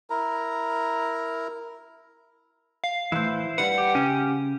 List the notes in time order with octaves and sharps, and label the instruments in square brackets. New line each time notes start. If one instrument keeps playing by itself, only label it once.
[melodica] E4 A#4 A#5
[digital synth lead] F5
[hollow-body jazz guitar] A2 E3 [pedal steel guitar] E4 C5
[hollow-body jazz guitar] G3 B4 [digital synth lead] F#5
[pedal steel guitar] G4
[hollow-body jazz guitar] C#3 [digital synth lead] C#4